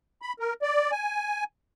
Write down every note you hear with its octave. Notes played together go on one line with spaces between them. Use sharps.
B5
A#4
D5
G#5